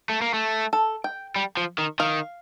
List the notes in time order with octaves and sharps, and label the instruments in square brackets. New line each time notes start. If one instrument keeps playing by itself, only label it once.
[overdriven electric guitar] A3
A#3
A3
[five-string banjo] A4
G5
[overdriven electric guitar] G3
F3
D#3
[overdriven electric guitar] D#3 [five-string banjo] F5